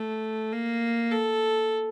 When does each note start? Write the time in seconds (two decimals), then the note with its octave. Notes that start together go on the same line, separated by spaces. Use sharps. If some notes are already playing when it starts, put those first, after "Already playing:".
Already playing: A3
0.53 A#3
1.12 A4